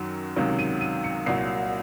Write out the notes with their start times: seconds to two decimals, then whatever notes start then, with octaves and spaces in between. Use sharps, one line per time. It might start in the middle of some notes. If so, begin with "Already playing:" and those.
Already playing: F#2 D#3 F#3
0.36 C#2 C3 D#3 F#3
0.59 D#7
0.81 D#7
1.04 C#7
1.26 C2 A#2 F#3 C7